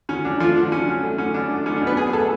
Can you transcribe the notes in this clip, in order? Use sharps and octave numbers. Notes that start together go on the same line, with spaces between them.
D2 C#4
F#3 D4
F3 A3 F4
D3 D4
D2 C#4
F#3
A3
D3 C#4
B1 D4
A3
B1 C#4
B2 D4
B3 B4
B1 G#4 G#5
A3 A4 A5